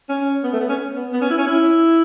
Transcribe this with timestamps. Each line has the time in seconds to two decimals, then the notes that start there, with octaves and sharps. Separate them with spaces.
0.09 C#4
0.43 B3
0.53 A3
0.60 B3
0.69 C#4
0.95 B3
1.13 B3
1.21 C#4
1.30 E4
1.38 C#4
1.46 E4